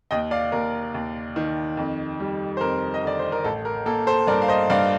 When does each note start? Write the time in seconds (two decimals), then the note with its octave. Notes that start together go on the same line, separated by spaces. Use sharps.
0.11 D#2 D#5 G5
0.31 D5 F5
0.52 D#2 A#4
0.94 D#2
1.36 D#3
1.77 F2
2.20 G3
2.57 C5
2.61 F2 A#4
2.94 D#5
3.03 D3 D5
3.19 C5
3.32 A#4
3.44 A1 A4
3.65 A#4
3.86 A#3 A4
4.07 A4 C5
4.27 G2 A#4 D5
4.42 F5
4.48 C5 D#5
4.70 G2 D5 F5